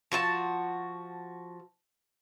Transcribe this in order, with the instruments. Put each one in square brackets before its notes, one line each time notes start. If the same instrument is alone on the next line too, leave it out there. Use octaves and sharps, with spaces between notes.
[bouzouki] F3 F#4 A#4 A5